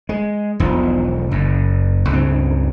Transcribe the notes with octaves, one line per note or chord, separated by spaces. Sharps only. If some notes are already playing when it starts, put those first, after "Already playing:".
G#3
E1 B1 F3
F#1 F#2
C#2 G2 C#3 C4